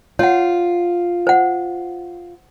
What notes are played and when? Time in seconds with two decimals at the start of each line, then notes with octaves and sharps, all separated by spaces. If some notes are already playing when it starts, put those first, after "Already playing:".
0.19 F4 C#5 F#5
1.27 C5 F#5